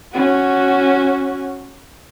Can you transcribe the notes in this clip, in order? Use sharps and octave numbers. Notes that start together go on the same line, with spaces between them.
C#4 F#4